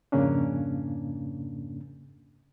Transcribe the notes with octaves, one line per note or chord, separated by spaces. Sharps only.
F2 G#2 C#3 A#3 C#4 D4